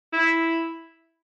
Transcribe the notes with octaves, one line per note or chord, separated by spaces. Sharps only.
E4